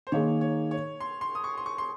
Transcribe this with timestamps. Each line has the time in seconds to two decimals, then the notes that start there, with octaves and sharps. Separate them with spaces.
0.07 C5
0.12 D#3 A#3 D#4 G#4 C#5
0.41 C#5
0.71 C#5
1.00 C6
1.21 C6
1.35 D#6
1.44 C#6
1.58 C6
1.66 C#6
1.78 C6